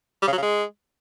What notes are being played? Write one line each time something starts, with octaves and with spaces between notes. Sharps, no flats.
G3
C#3
F#3
C#3
G#3